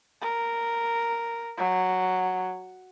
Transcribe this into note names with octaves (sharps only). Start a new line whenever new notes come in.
A#4
F#3